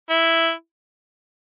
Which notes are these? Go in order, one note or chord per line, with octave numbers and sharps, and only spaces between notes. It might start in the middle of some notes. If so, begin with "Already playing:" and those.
E4